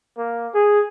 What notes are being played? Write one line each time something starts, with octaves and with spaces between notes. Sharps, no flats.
A#3
G#4